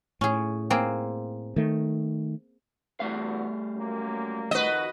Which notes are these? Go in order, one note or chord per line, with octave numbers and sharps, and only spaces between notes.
A2 C#4 G#4
A#3 C4 G#4
D#3 A3
E2 G3 A3 F#4 F5
C#2 F#2 A#3
F2 D#3 F#4 B4 D#5